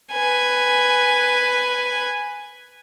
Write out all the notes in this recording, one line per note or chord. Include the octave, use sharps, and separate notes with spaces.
B4 G#5